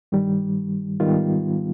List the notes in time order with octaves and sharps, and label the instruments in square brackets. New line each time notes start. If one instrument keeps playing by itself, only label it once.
[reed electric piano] G2 D#3 G3
G#2 D#3 G3 B3 F4